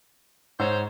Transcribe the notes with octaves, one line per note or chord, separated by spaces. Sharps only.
G#2 C5 C#5 F#5 E6